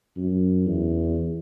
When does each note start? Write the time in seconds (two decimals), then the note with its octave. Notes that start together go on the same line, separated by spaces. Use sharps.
0.16 F#2
0.66 E2